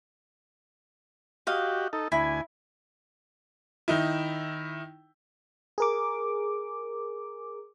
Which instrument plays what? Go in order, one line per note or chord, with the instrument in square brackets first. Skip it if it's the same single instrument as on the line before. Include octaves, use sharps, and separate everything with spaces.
[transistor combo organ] F#4 G4 [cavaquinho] D#5 F5
[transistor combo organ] D#4 A4
[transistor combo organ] D2 G#5 [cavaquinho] E4
[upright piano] D#3 D#4 E4
[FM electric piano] G#4 A#4 D6